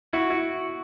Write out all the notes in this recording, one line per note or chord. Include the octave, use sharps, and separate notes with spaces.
E4 F#4
E4